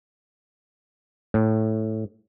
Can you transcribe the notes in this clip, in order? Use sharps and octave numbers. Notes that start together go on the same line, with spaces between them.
A2